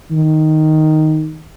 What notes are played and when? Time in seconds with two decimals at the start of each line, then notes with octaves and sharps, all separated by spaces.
0.11 D#3